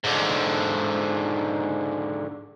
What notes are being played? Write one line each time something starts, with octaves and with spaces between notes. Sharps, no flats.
G#2 D3